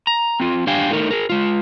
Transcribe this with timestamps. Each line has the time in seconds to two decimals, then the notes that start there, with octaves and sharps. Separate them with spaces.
0.07 A#5
0.40 C4 F4
0.67 D4 G4 F5 G5 G#5
0.91 A3 D#4 A#4
1.11 G#4 A#4
1.30 G#3 F4